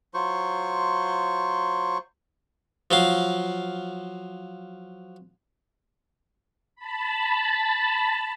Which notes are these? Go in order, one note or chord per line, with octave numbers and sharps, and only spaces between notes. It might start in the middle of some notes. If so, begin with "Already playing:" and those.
F#3 F4 C5 C#6
F3 F#3 F5
A5 B5